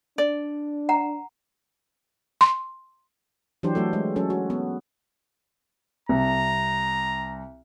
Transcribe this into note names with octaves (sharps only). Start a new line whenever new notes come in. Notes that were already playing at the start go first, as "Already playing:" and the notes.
D4 D5
F#5 A#5
C6
E3 F#3 D4 G4 C5
F#3 A3 F#4 A4
G#3
F#3 C#4 A4
F#4
B3
C2 A#5